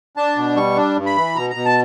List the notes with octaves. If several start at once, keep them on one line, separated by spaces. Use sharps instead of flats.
D4 A5
B2
G3 C#6
D4
G2
B5
E3
B2 A#5
A#5
B2
A5